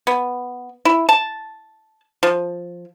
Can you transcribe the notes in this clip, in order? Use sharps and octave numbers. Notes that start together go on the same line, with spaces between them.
B3
E4
A5
F3